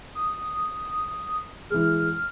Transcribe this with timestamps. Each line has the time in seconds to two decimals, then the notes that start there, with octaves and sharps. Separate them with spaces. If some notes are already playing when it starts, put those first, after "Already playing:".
0.15 D#6
1.70 E3 G#3 F6